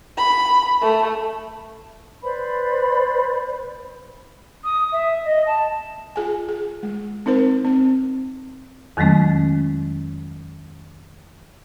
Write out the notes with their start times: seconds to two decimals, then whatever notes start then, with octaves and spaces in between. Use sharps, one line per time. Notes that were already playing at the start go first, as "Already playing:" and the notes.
0.18 B5
0.82 A3
2.23 B4 C5 D5 B5
4.64 D#6
4.92 E5
5.25 D#5
5.46 A5
6.16 F4 G#4 G#5
6.48 G#4
6.83 G#3
7.26 C4 D#4 A#4 C5
7.65 C4
8.97 F2 D#3 F#3 G#3 A3 C#4